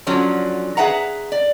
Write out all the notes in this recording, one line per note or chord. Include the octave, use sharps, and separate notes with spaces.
D3 F3 F#3 C#4
G#4 A4 B4 E5 F#5 A#5
D5